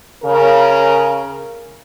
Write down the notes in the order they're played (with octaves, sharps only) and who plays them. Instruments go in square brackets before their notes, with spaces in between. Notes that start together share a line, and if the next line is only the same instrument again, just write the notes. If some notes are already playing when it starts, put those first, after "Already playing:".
[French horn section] C#3 A#4